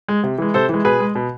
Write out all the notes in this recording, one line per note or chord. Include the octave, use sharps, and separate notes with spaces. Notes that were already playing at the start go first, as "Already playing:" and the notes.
G#3
C3
E3 G#3
C3 A4 C5
E3 G#3
B2 G#4 B4
G#3
B2